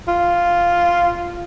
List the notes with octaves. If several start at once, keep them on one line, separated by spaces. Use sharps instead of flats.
F4